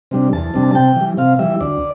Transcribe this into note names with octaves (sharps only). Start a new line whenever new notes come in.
C3 G3 D4
E2 A5
C3 G3 D4
A5
C3 G5
E3 G3
C3 F5
E3 G3 E5
D2 D5